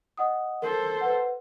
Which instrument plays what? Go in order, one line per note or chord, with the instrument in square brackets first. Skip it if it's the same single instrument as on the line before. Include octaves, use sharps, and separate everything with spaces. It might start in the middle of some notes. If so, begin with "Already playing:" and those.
[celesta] D#5 F#5 D#6
[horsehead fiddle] A4 C5 [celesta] A#4
[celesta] B4 F#5